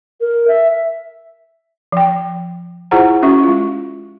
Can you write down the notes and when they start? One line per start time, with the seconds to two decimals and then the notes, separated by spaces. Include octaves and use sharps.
0.21 A#4
0.48 E5
1.92 F3 G5
2.91 E4 F4 G#4 C5 F#5 A#5
3.23 C#4 F#4 E5 C#6
3.43 G#3 F4